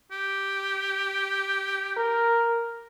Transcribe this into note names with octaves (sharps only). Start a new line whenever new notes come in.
G4
A#4